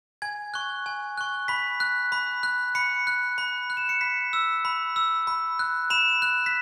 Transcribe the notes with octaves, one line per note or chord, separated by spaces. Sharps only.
G#5 G#6
C#6 F#6
G#5
C#6 F#6
B5 B6
F#6
B5
F#6
B5 C#7
F#6
B5
F#6
E7
C#7
B5 B6
E6
B5
E6
B5
F#6
B5 E7
F#6
B6